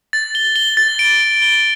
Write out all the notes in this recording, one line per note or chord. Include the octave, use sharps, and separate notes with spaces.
A6
G7
G7
A6
D7
G7
G7